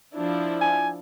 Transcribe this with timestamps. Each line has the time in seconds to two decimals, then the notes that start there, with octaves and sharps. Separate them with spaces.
0.13 F3 D4 E4
0.61 G#5